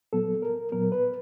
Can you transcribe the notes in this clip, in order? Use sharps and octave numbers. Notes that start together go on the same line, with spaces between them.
A#2 F#3 B3 A4
A#4
A#2 F#3 B3 A#4
B4